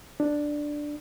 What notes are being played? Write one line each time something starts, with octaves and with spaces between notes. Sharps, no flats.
D4